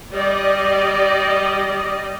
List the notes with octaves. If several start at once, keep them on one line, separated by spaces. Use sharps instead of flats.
G3 D5 D#5